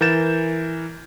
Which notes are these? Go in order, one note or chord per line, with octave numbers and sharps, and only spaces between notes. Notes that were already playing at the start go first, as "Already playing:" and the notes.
E3 A#4 G6 A6 E7